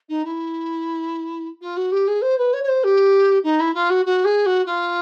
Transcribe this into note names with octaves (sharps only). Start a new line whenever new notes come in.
D#4
E4
F4
F#4
G4
G#4
C5
B4
C#5
C#5
C5
G4
D#4
E4
F4
F#4
F#4
G#4
F#4
F4